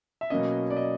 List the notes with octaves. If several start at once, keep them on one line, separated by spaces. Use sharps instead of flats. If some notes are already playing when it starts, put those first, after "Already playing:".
E5
B2 F#3 A#3 C#4 D#5
D5
D#5